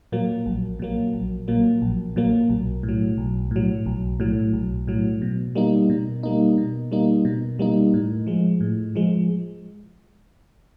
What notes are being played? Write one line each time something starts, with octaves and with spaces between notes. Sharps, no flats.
A#2 F#3 A#3
A#1
A#2 F#3 A#3
A#1
A#2 F#3 A#3
A#1
A#2 F#3 A#3
B1
A2
F#3
B1
A2 F#3
B1
A2 F#3
B1
A2 F#3
B2
G3 A#3 D#4
B2
G3 A#3 D#4
B2
G3 A#3 D#4
B2
G3 A#3 D#4
A2
F3 G#3
A2
F3 G#3